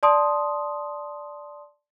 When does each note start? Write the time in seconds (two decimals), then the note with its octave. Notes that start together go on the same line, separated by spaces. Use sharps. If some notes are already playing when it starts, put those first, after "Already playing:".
0.03 D5 A5 C6 D#6